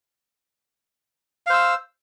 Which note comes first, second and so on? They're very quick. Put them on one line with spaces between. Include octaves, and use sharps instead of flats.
F5 C5 E6